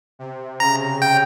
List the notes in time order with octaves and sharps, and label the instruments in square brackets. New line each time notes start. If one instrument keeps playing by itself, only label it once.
[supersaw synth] C3
[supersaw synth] C#3 [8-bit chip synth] A#5
[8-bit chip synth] G5